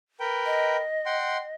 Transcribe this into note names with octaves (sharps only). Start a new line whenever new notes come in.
A#4 B4 G5
D#5
F#5 G5 C6